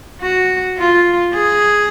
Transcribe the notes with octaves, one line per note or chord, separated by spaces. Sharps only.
F#4
F4
G#4